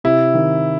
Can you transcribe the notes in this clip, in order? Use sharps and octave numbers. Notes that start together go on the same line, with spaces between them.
C3 E4
D#3